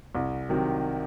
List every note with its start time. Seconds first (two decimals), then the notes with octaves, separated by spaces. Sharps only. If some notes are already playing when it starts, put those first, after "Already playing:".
0.15 C2
0.49 C3 D#3 F#3